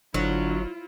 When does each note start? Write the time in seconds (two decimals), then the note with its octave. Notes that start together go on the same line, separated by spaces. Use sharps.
0.14 G1 D3 F#3 E4 F4